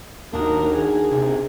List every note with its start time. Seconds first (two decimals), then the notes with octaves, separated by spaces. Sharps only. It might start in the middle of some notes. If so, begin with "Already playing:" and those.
0.33 D#2 D4 D#4 F#4 A#4
0.74 G#4
1.11 C3